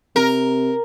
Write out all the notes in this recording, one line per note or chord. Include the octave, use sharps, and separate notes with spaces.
C3 A#4